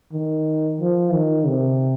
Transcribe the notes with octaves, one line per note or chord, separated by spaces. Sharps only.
D#3
F3
D#3
C3